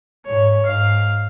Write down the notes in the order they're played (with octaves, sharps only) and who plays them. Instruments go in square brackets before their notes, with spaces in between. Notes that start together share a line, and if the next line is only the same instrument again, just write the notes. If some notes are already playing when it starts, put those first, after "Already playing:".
[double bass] G#2 [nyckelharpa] C#5
[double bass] G#2 [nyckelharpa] F5